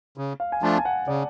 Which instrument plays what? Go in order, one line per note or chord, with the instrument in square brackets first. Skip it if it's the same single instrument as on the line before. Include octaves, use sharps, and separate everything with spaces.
[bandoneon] C#3
[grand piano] F5
G#5
[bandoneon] F3 A3 D4 F4 [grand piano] A5
[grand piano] G#5
F#5
[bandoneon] C#3 [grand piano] D5